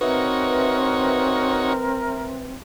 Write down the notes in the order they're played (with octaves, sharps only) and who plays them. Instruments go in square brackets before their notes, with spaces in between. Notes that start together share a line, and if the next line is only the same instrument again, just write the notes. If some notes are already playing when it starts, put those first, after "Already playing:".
[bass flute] C4 [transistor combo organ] D#4 F#4 C#5 [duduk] A#4 [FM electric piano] B4 E5